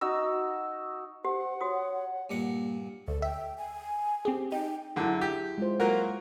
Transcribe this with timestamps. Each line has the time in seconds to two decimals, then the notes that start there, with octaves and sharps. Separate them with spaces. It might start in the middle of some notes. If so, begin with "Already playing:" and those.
0.01 D#4 F#4 E6
1.25 G4 C5 F#5
1.61 F#4 C#5 D#6
2.30 G2 A#2 A#3 F#5
3.08 D2 A4
3.22 E5 G5
3.58 G#5
4.25 C4 G4 G#4
4.52 D#4 G5
4.96 F#2 D3 E4 G#4
5.21 G4
5.58 G#3 F4 C5
5.80 F#3 A#3 A#4 F#5